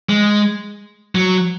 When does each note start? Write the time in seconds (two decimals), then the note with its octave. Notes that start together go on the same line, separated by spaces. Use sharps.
0.09 G#3
1.15 F#3